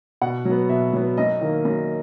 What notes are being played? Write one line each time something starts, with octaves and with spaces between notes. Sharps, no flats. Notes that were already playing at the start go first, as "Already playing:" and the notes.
B2 F#5
F#3 B3
B2 E5
F#3 B3
F#2 D#5
D#3 A#3
F#2